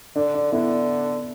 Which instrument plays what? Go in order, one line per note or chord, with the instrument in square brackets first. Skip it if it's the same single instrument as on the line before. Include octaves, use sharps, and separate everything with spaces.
[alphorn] D3 [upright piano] D4
[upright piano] D4
[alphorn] D3 [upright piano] B3 E4